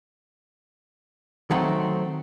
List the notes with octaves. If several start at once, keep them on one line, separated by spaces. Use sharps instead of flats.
D#3 F#3 A3 C4 D#4 F#5